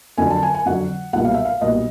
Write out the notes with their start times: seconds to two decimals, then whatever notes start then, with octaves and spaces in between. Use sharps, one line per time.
0.18 F2 D3 F#3 G#5
0.30 A5
0.43 G#5
0.55 G#5
0.66 F2 D3 F#3 F#5
1.13 B1 A#2 G3 F#5
1.25 F5
1.34 E5
1.45 F5
1.61 B1 A#2 G3 D#5